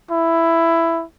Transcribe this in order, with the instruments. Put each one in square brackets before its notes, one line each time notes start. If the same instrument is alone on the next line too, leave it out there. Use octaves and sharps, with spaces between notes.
[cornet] E4